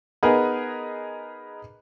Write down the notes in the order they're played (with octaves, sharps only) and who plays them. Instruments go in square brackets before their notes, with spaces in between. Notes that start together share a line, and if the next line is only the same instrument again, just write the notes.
[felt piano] B3 D#4 G#4 A#4 B4